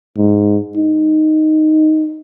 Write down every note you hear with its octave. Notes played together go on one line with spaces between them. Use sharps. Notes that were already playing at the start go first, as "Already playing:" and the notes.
G#2
D#4